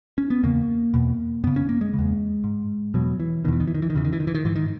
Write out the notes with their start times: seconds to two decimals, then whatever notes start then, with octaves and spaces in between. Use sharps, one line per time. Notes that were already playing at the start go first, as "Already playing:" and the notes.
0.18 C#4
0.30 B3
0.43 E2 C#3 A#3
0.94 E2 B2
1.44 F#2 C#3 B3
1.56 C#4
1.69 A#3
1.81 G#3
1.94 C#3
1.99 E2
2.44 G#2
2.94 E2 B2 F#3
3.20 E3
3.44 B2 D#3
3.48 E2 E3
3.60 D#3
3.67 E3
3.75 D#3
3.82 E3
3.90 D#3
3.95 E2 C#3 E3
4.05 D#3
4.13 E3
4.20 D#3
4.27 E3
4.35 D#3
4.45 G#2 E3
4.56 D#3